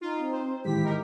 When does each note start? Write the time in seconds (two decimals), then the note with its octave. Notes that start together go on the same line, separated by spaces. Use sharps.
0.01 D#4 F4
0.19 C4
0.32 C5
0.65 A1 D#2 G#2 E4 G4 B6
0.84 D#3 D#4 A#4